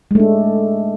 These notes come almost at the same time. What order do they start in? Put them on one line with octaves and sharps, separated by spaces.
G#3 A3 D4